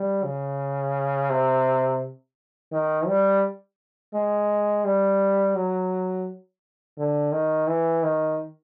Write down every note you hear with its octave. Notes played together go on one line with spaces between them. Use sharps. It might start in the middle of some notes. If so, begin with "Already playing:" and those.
Already playing: G3
C#3
C3
D#3
G3
G#3
G3
F#3
D3
D#3
E3
D#3